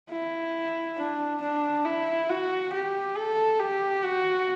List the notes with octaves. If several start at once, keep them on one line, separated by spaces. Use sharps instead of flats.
E4
D4
D4
E4
F#4
G4
A4
G4
F#4